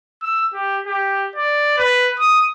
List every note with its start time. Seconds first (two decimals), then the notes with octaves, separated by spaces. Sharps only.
0.22 E6
0.53 G4
0.86 G4
1.36 D5
1.78 B4
2.20 D#6